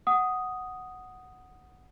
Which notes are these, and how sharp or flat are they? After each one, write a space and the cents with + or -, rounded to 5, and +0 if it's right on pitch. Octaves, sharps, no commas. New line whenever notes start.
F#5 +0 D#6 +0